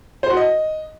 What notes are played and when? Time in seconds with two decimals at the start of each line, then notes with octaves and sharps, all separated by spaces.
0.23 C5
0.30 F#4
0.37 D#5